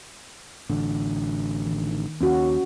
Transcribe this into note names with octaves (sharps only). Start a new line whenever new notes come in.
A1 D3
D#3
D#2 C#4 F#4